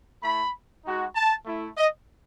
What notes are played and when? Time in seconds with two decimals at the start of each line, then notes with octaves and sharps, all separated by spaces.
0.22 A3 E4 B5
0.85 G#3 D#4 F#4
1.16 A5
1.46 A3 E4
1.78 D#5